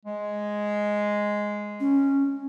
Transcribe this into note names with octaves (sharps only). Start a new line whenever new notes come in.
G#3
C#4